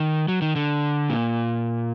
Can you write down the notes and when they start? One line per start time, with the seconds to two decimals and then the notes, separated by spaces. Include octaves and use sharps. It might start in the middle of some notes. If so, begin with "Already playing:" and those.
Already playing: D#3
0.28 F#3
0.42 D#3
0.56 D3
1.10 A#2